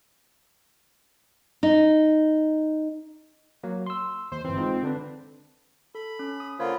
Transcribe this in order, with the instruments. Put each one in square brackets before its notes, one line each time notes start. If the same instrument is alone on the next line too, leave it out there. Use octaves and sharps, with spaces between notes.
[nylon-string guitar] D#4
[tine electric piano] F#3 A#3
C6 E6
[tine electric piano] D#2 [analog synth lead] C5
[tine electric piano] G1 E3 [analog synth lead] C4
[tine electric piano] G#3 D#4 F4
D3 D4 B4
[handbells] A4 [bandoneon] B5
[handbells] C#4
D#6
[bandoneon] D3 A#3 F4 [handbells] C5 C#5 B5